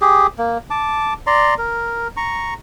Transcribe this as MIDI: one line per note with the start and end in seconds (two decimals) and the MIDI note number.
0.01 0.27 67
0.01 0.27 68
0.38 0.58 58
0.70 1.14 81
0.70 1.14 86
1.27 1.54 74
1.27 1.54 82
1.27 1.54 84
1.58 2.08 70
2.17 2.54 82
2.17 2.54 85